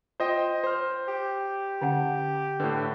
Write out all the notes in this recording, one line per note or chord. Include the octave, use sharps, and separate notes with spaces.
F4 C5 D#5 G5
C5 F6
G4
D3 C#4 F#5
A2 D3 B4